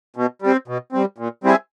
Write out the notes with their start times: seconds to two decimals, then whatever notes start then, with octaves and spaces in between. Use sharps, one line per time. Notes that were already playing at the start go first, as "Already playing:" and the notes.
0.16 B2
0.42 G3 C4
0.68 B2
0.93 G3 C4
1.18 A#2
1.44 G3 C4 E4 G#4